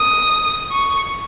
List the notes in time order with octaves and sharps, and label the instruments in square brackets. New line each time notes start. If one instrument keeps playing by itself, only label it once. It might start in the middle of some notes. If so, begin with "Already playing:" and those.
Already playing: [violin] D#6
C#6